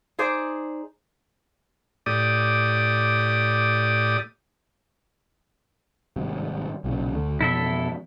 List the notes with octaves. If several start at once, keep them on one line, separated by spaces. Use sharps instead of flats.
D#4 G#4 C5 D5
A2 G4 D5 D#6
G#1 G2 C3
B1 A#2 C#3
D2 D3 A3
F2 B2 E3 E4 A4 E5